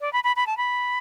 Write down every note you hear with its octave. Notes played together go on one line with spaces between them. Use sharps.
D5
B5
B5
B5
A5
B5